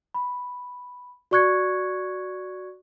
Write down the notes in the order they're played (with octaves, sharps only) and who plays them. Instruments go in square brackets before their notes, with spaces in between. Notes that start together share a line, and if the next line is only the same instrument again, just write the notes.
[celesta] B5
F#4 D5 C#6 F#6 G#6 C#7